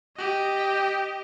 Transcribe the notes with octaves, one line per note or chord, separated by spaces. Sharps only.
G4 D#5